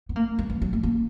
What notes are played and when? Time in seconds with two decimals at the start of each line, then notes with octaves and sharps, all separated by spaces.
0.09 B3
0.16 A#3
0.39 G#3
0.50 E3
0.62 F#3
0.73 A#3
0.83 A#3